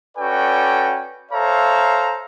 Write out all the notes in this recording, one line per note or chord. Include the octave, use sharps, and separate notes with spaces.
C#4 F#4 A4 B4 D5 G5
A4 C5 C#5 E5 F5 A#5